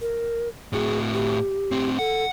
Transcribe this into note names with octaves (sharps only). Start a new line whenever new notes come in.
A#4
A2 F#4 G#4
G4
A2 C4
A4 F#5